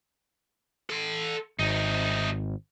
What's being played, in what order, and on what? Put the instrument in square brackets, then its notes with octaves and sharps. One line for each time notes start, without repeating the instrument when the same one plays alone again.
[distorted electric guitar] A4 C6
[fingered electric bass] G#1 [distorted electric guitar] C3 D#4